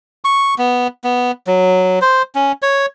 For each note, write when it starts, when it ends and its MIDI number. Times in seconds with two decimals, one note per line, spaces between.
0.25 0.55 85
0.58 0.88 59
1.04 1.32 59
1.47 1.99 54
2.01 2.22 72
2.35 2.52 61
2.62 2.86 73